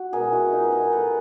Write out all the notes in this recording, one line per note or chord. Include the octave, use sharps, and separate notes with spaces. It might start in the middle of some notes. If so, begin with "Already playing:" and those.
Already playing: F#4
B2 G#3 G#4 A#4
E4 F#4
D#4 F4
B4
G#4 A#4
A4 B4